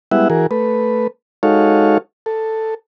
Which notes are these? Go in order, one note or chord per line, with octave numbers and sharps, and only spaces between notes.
G3 G#3 B3 E4 E5 F#5
E3 F#4 G#4 A#4
A3 B4
G#3 D#4 F#4 A4 C#5 F5
A4